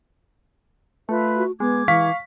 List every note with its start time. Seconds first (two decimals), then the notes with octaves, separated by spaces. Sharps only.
1.09 A3 F4 B4 E5
1.36 F#4
1.60 G#3 B3 D6 G#6
1.88 E3 F5 C#6 B6